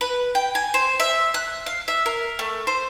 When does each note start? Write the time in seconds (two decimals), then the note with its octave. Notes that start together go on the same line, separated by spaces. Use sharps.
0.01 B4
0.35 G5
0.55 G#5
0.74 C5
1.00 E5
1.34 F#6
1.66 F5
1.88 E5
2.06 A#4
2.39 A3
2.67 C5